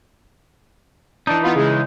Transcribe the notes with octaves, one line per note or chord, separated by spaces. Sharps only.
E3 D4 D#4
B3 F4 B4
C#3 G#3